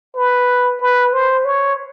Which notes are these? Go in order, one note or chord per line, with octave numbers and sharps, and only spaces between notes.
B4
B4
C5
C#5